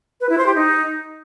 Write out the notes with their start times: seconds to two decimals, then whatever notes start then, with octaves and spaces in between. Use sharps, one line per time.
0.21 B4
0.29 E4
0.38 C5
0.46 G4
0.55 D#4